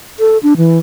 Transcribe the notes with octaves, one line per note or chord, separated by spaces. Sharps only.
A4
D4
E3